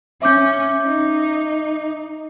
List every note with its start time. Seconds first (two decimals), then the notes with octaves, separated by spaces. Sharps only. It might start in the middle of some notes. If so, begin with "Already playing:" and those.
0.22 C#4 E5 D6 G6
0.86 D#4